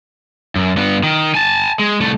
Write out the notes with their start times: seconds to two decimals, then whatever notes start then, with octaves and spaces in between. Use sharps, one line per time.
0.56 F#2
0.77 G2 B3
1.03 D#3
1.35 G#5 A5
1.79 G#3
2.00 C2 A3